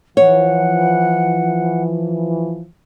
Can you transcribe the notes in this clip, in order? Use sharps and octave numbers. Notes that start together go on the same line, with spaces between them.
E3 F3 C#5 F#5